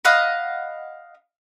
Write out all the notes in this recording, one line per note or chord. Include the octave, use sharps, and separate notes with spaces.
D#5 F5 F#5 B5